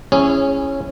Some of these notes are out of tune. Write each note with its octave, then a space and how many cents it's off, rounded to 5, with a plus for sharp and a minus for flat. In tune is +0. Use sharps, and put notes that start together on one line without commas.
C#4 -10 E4 +10 G#4 -20